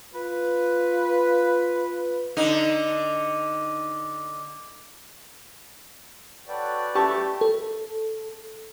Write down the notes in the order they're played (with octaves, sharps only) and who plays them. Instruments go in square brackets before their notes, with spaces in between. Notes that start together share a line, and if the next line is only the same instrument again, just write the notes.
[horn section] F4 B4
[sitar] D3 D#4
[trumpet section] F#4 A4 C#5 [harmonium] B4 D5 G5
[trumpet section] A3 [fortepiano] G4 A5 C#6
[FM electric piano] A4